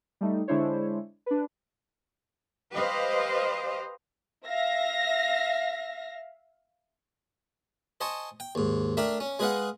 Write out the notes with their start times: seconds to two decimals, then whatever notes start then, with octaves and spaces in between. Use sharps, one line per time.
0.21 G3 A3 D#4
0.48 D3 G#3 D4 E4 C5 C#5
1.26 D4 B4
2.72 G4 B4 C5 D#5 F5
4.48 E5 F5 A#6
8.01 C5 D#5 G#5 A5 C#6
8.40 G5
8.55 D#2 G#2
8.97 A3 D4 A#4 D5 E5 G5
9.20 C#4
9.39 G#3 G#4 B4 D#5 F5 F#5